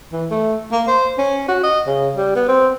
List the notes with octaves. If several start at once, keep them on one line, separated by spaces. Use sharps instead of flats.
E3
A3
A#3
C5
C#4
F#4
D#5
C#3
G3
B3
C4